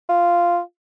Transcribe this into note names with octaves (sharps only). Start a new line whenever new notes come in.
F4